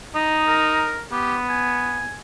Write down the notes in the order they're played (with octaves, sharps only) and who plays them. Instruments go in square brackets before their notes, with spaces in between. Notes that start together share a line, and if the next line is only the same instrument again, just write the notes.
[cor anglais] D#4 [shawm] D#5
[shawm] A#4
[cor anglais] B3 [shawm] G4
[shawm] G#5